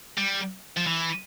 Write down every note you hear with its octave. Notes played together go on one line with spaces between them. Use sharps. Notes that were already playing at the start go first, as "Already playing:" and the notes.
G3
F3
E3